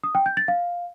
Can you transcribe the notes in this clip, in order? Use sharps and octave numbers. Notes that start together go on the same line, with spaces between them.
D#6
G5
G6
A6
F5